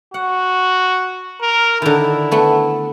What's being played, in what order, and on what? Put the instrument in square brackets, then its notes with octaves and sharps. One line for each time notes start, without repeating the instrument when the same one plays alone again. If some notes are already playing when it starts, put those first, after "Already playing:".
[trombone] F#4 [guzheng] F#5
[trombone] A#4
[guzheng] D3 D#3 [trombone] E4
[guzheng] A3 B3